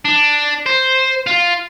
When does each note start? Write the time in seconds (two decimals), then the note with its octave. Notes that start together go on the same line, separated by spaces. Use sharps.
0.05 D4
0.66 C5
1.26 F4